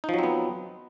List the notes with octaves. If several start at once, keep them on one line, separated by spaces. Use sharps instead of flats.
F3 F#3 B3 C4 D#4